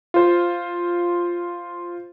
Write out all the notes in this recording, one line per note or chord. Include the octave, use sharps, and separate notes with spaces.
F4 C5